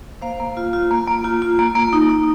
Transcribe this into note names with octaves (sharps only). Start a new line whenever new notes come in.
A#3 C5 F5
A#3
F4
F4
A#3
A#3
F4
F4
A#3
A#3
D#4
D#4